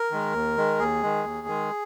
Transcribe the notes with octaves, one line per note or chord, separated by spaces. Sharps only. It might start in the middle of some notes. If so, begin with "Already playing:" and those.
Already playing: A#4
D#3 G#3
D#2
D#3 G#3
D#2 G#4
D#3 G#3
D#2
D#3 G#3